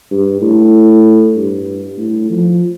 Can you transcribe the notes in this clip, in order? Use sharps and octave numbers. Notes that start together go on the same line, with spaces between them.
G2
A2
G2
A2
F3